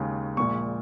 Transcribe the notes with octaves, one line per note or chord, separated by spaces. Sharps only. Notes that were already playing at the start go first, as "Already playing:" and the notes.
Already playing: D#2 C#3 G#3
A#1 A#2 G#3 C#6